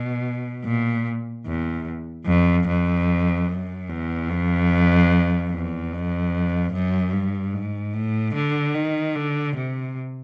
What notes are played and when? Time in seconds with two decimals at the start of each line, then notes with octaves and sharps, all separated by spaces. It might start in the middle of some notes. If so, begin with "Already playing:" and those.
Already playing: B2
0.65 A#2
1.46 E2
2.26 F2
2.67 F2
3.48 F#2
3.89 E2
4.30 F2
5.51 E2
5.92 F2
6.73 F#2
7.13 G2
7.54 G#2
7.94 A2
8.35 D3
8.75 D#3
9.16 D3
9.56 C3